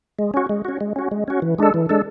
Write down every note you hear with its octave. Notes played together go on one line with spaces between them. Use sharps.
G#3
C#4 F#4
G#3
C#4 F#4
G#3
C#4 F#4
G#3
C#4 F#4
E3
G#3 D4 A4
E3
G#3 D4 A4